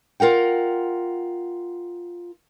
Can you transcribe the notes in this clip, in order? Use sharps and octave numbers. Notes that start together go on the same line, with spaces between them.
F4 A#4 F#5 G5